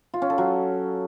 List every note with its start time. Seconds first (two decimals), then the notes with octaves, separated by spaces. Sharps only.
0.14 F4
0.22 C#4
0.30 A4
0.38 F#3